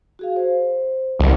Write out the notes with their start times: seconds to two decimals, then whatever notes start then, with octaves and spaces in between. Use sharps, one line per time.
0.19 F#4 G#4 F5
0.36 C5
1.19 C2